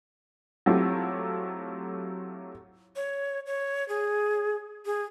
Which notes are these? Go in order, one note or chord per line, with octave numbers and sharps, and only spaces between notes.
F#3 A3 C4 E4 F4 G4
C#5
C#5
G#4
G#4